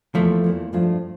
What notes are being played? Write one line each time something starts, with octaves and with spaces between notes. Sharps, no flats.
E2 E3 F3 A3 A#3
E2 E3 A#3
G2 F3 A3 D4 F4